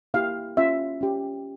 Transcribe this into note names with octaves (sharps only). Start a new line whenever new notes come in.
A#3 E4 G4 F5
C#4 F4 E5
C#4 G4